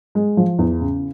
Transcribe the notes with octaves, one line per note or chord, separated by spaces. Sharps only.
G#3
F3
E2
C#3